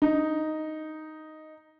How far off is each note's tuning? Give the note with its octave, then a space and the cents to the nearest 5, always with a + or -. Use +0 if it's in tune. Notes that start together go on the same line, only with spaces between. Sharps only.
D#4 +0